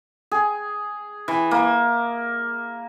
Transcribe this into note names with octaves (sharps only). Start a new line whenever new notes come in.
G#4
E3
A#3